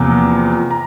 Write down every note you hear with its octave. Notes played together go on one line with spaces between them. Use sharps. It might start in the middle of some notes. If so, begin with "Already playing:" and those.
Already playing: E2 C3 F3 A#3 A#5
A#5